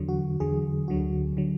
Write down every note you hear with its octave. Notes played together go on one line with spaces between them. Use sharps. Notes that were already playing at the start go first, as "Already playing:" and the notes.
Already playing: E2 D3 F#3
F#4
E2 D3 F#3 G#4
D2 D3 F#3 F#4
D3 F#3